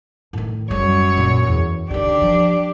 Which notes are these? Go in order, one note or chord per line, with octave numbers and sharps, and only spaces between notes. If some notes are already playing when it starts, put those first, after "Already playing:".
A2 D#3
F#2 G3 G#3 C#5
A#2
E2
D3 D#3 D4 G4
F3